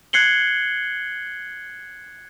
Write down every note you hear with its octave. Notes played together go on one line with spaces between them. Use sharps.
F#6 G#6 C7 C#7 F#7 G7